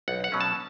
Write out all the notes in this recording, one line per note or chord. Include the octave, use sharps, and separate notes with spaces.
B1 F#5
F#5
B2 F#3 C#4
A5